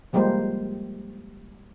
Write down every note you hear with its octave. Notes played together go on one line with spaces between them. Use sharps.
F3 G3 G#3 A#3 G4 C5